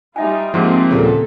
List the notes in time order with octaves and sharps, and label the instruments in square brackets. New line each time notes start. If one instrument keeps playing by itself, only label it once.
[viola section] G3 D#4 F4 [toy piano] E5 G#5
[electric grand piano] G#2 F3 [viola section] A#3 C4 F4 [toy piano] G4 G#4 A#4
[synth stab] D#2 A#2 C#3 [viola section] A#3 A4